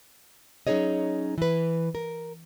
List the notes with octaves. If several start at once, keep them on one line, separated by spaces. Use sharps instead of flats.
F#3 C#4 D#4 G#4 C#5 D#5
E3 B4
A#4